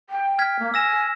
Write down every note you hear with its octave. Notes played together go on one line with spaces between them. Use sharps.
G5
F6 G#6 B6
A#3
G#5 E6 A#6 E7